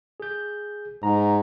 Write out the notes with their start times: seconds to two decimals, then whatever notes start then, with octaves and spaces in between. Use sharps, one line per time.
0.20 G#4 G6
1.03 G#2 A#5